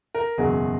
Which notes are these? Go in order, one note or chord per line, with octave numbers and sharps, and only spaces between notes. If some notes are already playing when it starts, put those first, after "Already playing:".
A#4
F#1 E2 B2 F#3 G#4